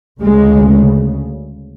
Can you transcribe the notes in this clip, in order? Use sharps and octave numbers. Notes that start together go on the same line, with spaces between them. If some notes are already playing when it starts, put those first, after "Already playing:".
D2 C#3 G#3